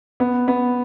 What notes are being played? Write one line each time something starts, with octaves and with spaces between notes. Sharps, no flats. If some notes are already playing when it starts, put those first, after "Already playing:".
B3
B3